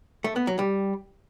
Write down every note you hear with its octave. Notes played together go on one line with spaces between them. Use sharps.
A3
B3
F#3
G3